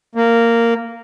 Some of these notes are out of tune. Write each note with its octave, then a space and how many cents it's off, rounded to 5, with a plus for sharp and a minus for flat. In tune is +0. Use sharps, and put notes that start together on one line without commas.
A#3 -10